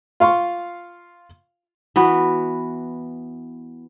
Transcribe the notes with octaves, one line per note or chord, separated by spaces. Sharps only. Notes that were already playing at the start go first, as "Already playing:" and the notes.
F4 F5 C6 C#6
E3 B3 F#4